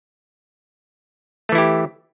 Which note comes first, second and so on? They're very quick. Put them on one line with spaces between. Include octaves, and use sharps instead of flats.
A3 E3 E4 G4